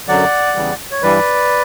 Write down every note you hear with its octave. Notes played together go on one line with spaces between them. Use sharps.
F#2 D3 F#3 D5 F#5
E2 C#3 E3 G3
C#5
G2 E3 G3 B4 D5